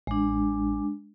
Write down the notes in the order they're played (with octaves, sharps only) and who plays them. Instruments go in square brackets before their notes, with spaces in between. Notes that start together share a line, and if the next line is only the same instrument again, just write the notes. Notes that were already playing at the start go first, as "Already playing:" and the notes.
[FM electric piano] A1 [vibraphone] G#3 D4